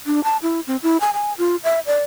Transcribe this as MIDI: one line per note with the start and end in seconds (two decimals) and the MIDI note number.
0.06 0.23 62
0.24 0.37 81
0.42 0.60 64
0.67 0.77 60
0.83 0.97 64
1.00 1.11 80
1.14 1.33 80
1.38 1.56 65
1.64 1.80 76
1.86 2.04 74